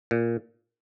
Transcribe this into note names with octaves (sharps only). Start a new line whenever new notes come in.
A#2